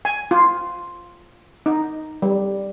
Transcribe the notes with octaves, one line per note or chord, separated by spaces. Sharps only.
G#5
F4
D#4
G3